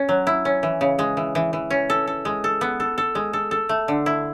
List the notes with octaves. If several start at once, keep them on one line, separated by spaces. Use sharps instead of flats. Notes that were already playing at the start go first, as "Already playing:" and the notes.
Already playing: C#4
F#3
E4
C#4
E3
C#3
G#3
E3
E3
E3
C#4
A4
A4
G#3
A4
B3
A4
A4
G#3
A4
A4
A3
D3
E4